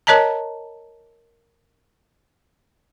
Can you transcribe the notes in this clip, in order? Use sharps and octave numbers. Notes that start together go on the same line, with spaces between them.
A#4 C#5 D#5 A5 A#5